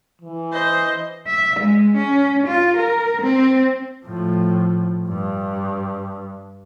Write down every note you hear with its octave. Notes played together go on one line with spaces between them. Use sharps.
E3
C5 D#5
E5
G#3
C#4
F4
A#4
C4
A2 F3
G2